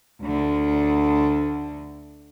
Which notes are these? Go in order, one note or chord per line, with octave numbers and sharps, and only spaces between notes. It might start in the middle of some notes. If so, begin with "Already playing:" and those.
D2 D3